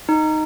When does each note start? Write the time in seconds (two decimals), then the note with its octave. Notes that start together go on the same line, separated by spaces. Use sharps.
0.09 D#4